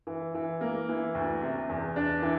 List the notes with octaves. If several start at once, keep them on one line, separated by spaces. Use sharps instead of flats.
E3
E3
A#3
E3
D2
C3
E2
D4
E3